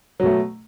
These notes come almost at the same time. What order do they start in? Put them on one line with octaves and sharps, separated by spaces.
F#3 B2 A3